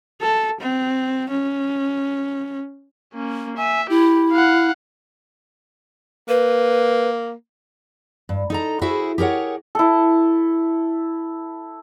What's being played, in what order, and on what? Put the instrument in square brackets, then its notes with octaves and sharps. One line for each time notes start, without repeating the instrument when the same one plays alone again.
[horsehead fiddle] A4
C4
C#4
[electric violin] A#3 C#4
[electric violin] E5 [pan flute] G#5
[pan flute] E4 [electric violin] G4
[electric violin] F5 F#5
[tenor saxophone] A#3 [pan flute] B4
[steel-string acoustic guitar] G2
D#4 A4 A#5
E4 F#4 G#4 C5 E5
G4 G#4 A#4 C#5 F#5
[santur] E4 A4